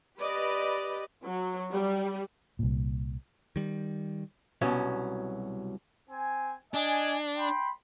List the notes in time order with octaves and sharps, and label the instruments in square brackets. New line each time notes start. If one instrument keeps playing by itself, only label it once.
[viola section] G4 B4 D5 D#5
F#3
G3
[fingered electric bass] C2 A#2
[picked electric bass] D#3 G3
[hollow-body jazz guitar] C2 B2 F#3 C#4 E5
[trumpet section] C4 G#5
[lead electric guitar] D4 [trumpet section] D#5 G#5
[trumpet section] G5 B5 C6